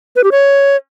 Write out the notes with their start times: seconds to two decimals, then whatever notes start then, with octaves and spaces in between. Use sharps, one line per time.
0.16 B4
0.24 G4
0.32 C#5